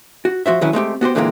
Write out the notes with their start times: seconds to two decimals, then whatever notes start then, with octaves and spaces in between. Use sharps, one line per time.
0.25 F#4
0.46 F3 F#4 C5 E5
0.61 D3 D#3 F#3 C#4 E4 B4
0.73 G#3 A3 C4 G4
1.01 B3 F#4 G4 C5
1.15 A#2 D3 E3 G#3 A#3 C4